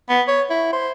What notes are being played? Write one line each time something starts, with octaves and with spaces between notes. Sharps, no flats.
B3
C#5
E4
C5